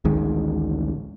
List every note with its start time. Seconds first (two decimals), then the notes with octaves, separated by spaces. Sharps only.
0.05 A1 D2 D#3 G#3